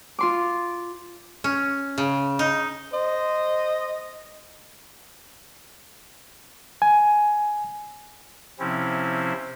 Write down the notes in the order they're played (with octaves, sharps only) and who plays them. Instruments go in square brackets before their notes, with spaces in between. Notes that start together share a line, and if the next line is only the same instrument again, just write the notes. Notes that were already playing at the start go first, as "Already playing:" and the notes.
[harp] F4 C6 D6
[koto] C#4
C#3
D#4
[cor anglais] C5 [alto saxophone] D#5
[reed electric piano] G#5
[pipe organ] C3 F3 C4 C#4 E4